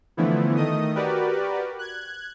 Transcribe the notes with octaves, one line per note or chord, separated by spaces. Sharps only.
D3 E3 F3 A3 B3 E4
D#3 A3 D#5 D#6
F#4 G4 A#4 B4 D5
F#6 G#6